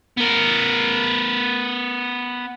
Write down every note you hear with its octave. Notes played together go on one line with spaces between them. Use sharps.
B3 A#4